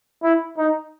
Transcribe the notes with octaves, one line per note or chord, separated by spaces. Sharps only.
E4
D#4